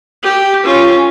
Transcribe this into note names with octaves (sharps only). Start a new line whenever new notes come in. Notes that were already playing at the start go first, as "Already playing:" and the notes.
G4
C#4 F4